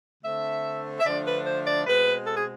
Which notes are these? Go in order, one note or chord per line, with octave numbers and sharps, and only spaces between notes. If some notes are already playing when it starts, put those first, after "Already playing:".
D3 A3 C4 E5
E5
D3 F3 A3 D4 D5
B4
C5
D5
B2 G#3 C4 B4
A4
G#4